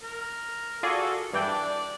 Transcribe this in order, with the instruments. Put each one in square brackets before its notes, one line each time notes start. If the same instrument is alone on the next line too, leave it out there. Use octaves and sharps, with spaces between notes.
[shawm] A#4
[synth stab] F4 G#4 D5 [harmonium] F#4 A4
[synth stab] G2 E3 G5 [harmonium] D4 [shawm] D5